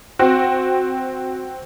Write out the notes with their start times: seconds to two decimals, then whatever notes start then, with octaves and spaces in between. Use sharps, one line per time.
0.19 C4 F#4